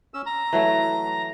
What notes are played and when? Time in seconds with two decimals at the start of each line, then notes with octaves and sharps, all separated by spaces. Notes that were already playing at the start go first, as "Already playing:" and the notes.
0.14 C#4 E6
0.26 A#5
0.53 E3 F#3 A3